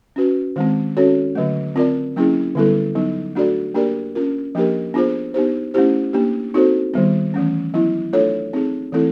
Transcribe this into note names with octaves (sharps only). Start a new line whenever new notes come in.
C#4 F#4 B4
D#3 G#3 C4
C#4 F#4 A4 C#5
D3 F#3 A3
C4 F4 A#4 D5
F#3 A#3 C#4 E4 G#4
D3 G3 B3 E4 A4
F#3 B3 D#4
A3 D4 F#4 A4 D5
A#3 D4 G4 A#4 D5
C#4 F4 A#4
F3 A#3 D4 G4 A#4
B3 D4 F4 G#4 C5
B3 D#4 G4 C5
A3 C#4 E4 G4 C5
A#3 D4 G4
C4 D#4 F#4 A4 C5
D#3 G3 B3
E3 A3 C#4
F#3 B3 E4
A3 D4 F4 A4 C#5
C4 D#4 G#4
E3 A3 C4 E4 A4